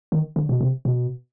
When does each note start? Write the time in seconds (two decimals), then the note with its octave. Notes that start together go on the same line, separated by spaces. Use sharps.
0.12 D#3
0.36 D3
0.49 B2
0.61 C3
0.85 B2